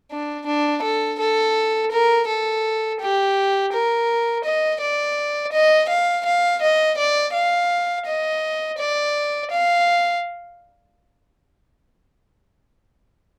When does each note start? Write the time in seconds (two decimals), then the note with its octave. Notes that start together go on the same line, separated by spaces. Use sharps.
0.12 D4
0.47 D4
0.83 A4
1.20 A4
1.92 A#4
2.27 A4
3.01 G4
3.73 A#4
4.45 D#5
4.81 D5
5.53 D#5
5.89 F5
6.26 F5
6.62 D#5
6.98 D5
7.33 F5
8.07 D#5
8.79 D5
9.51 F5